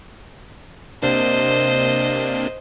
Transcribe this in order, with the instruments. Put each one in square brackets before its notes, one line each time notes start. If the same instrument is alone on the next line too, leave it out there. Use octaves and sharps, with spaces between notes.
[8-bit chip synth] C3 A#3 D4 [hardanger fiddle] C5 D#5